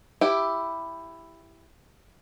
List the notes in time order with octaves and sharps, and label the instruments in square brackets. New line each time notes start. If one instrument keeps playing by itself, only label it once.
[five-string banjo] E4 G4